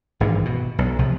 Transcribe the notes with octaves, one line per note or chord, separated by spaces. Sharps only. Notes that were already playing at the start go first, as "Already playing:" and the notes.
G#1 G2 E3
B2
B1
C2 C3 F3